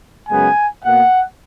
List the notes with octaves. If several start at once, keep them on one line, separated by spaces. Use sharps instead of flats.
F#2 C#3 G#3 B3 G#5
B2 A#3 F#5